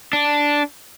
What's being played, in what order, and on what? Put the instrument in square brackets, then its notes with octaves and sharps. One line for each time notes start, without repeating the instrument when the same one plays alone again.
[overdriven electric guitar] D4